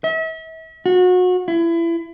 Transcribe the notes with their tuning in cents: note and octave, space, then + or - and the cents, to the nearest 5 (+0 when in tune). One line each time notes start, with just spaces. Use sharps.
E5 -40
F#4 -30
E4 +30